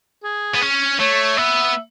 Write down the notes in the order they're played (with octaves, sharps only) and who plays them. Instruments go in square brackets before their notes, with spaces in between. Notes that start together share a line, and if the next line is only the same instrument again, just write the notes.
[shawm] G#4
[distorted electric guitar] B3
C#4
[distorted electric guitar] A3 [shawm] C#5
[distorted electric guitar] B3 [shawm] E5